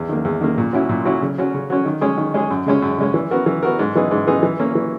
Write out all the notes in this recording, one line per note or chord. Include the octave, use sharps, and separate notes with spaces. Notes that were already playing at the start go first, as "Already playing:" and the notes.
Already playing: E2
D#3 A#3
E2
D#3 A#3
A#2
F#3 C#4 E4
A#2
F#3 C#4 E4
C#3
F#3 C#4
C#3
F#3 C#4
D#3
G#3 C#4 G#4
D#3
G#3 C#4 G#4
F#2
C#3 G#3 C#4
F#2
C#3 G#3 C#4
E3
B3 F#4 A#4
E3
B3 F#4 A#4
G#2
E3 B3 D#4 G#4
G#2
E3 B3 D#4 G#4
E3
A#3 C#4
E3